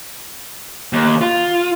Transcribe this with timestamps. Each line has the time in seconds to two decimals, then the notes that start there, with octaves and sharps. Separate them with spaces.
0.93 D#2
1.21 F4